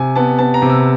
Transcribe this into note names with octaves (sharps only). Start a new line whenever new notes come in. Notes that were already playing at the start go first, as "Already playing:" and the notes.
Already playing: C3 G#5
B3 A5
B3 A5
A#5
C3
E6